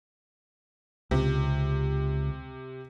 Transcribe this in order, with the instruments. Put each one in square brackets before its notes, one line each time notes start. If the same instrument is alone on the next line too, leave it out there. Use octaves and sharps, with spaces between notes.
[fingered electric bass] C#2 [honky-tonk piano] C3